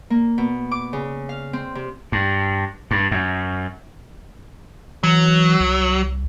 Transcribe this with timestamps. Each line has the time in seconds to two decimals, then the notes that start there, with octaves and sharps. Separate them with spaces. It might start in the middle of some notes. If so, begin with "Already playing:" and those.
0.10 A#3
0.38 B2
0.71 D6
0.93 C#3
1.29 F5
1.53 C4
1.75 C3
2.12 G2
2.91 G2
3.11 F#2
5.04 E3 F#3
5.60 C2